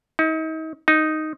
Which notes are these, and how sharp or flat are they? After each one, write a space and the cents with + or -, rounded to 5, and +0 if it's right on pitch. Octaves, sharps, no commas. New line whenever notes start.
D#4 +40
D#4 +0